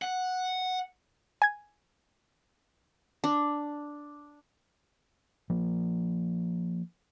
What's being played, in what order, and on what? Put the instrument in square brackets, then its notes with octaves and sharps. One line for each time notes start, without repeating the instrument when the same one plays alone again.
[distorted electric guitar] F#5
[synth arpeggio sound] G#5 G#6
[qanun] D4
[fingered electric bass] F3 A#3